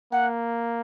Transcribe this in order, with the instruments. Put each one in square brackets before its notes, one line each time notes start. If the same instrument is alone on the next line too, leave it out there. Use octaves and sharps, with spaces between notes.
[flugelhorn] A#3 [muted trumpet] F#5